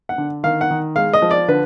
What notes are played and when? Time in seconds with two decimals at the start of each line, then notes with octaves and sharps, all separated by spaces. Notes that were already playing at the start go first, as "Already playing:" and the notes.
0.09 F#5
0.18 D3
0.43 D#3 F5
0.61 F#5
0.71 D#3
0.96 G#3 F5
1.13 D#5
1.22 F3
1.31 D5
1.48 D3 B4